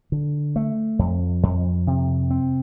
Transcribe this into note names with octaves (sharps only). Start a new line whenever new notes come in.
D3
A3
F2
F2
C3
C4